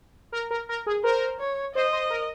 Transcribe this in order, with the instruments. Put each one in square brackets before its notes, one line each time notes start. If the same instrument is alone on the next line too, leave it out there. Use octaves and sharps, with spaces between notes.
[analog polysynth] A#4
A#4
A#4
G#4
[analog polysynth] A#4 [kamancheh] C5
[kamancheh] C#5
[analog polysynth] C5 [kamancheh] D#5
[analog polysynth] C5
A#4